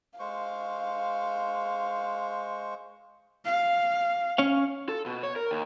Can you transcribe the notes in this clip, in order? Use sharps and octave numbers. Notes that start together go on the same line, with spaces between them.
G#3 C5 F5 C#6
F5
C#4 C#5 F5
A4
B2
C#5
A#4
D#2